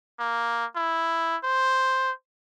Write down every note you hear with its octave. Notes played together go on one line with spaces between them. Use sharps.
A#3
E4
C5